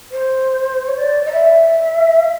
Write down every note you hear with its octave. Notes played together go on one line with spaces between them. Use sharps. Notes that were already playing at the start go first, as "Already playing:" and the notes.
C5
C#5
D5
D#5
E5